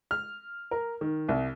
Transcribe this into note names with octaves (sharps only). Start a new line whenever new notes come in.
F6
A#4
D#3
C2